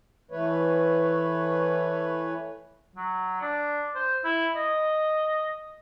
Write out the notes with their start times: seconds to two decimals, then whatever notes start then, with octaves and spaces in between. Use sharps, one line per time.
0.31 E3 A3 B4 C#5
2.96 F#3
3.41 D4
3.95 C5
4.24 E4
4.55 D#5